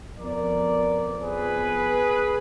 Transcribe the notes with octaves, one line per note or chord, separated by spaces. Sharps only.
F2 F3 B3 A#4 D5
G#4 B4